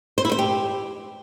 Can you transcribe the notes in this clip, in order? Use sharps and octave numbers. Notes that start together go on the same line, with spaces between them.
C5
E4
C5
G4